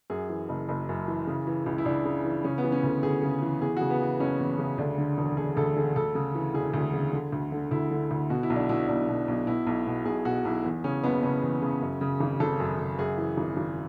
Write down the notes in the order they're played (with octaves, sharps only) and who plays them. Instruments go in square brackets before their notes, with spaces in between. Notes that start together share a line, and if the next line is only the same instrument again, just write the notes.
[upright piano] F#2 G#4
E3
F#1
F#1
F#2
E3
C#3
E3
C#2
E4
C#2 D4
C#3
E3
C#3 C#4
B3
E3
C#4
D2
D2 G#4
C#3
E3
E2 G#4
C#3 F#4
B3
E3
F#1 C#4
E2
C#3
D2 D4
D3
E1
E1 G#4
D2 A4
D3 G#4
D2 A4
C#3
E3
E1 G#4
D2
C#3
D3
D2
D3
D2 E4
D3
D2
B2 F#4
E4
B1
D4
B2 E4
B1 D4
B2
B1
B2 E4
B1
B2
B1 G#4
B2 F#4
B1 E4
E2
C#3 C#4
F#1 B3
F#1 C#4
E2
C#3
F#2
C#3
G#1
G#1 A4
F#2
C#3
F#2 G#4
E3
G#1
G#1